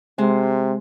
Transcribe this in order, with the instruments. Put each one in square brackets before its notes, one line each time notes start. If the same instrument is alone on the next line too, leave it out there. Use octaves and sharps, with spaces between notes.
[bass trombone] C3 [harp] G#3 C5